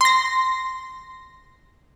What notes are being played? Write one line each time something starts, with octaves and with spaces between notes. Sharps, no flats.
C6 A#6